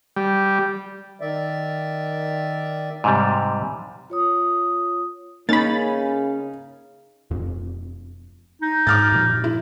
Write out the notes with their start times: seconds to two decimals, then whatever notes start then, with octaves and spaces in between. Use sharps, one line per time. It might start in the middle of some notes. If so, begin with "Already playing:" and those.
0.16 G3
1.21 D#3 D5 E5
3.04 G#2 C3 G3
4.10 F4 C#5 D#6
5.49 C#3 A#3 C#4 D#4 B5 A6
7.31 E1 F2
8.62 D#4
8.87 G#2 D6 F6 A6
9.12 F#2 A#2 F3
9.44 E4